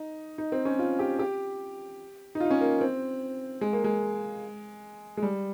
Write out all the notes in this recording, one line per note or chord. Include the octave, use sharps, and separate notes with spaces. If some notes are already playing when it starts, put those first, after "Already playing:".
Already playing: D#4
D#4
C4
C#4
F4
G4
G4
D#4
F4
D#4
C#4
A#3
C4
G#3
A#3
G#3
G#3
G3